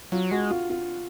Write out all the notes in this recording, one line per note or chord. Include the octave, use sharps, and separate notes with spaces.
F#3 F4
G#3 F#4
F4
F4